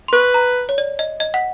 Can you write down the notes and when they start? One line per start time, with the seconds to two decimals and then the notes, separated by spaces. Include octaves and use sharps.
0.08 C6
0.13 B4 C#6
0.34 A#5
0.69 C#5
0.78 D5
0.99 D#5
1.20 D#5
1.34 F#5